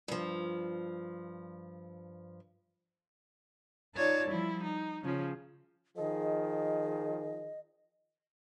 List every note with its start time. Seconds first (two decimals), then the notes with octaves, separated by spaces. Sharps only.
0.08 G2 F3
3.94 D#4 F4 C#5 D5 A5
4.28 F3 G3 E4
4.64 D#4
5.03 C#3 F3 C#4
5.97 D#3 F3 G#4 D#5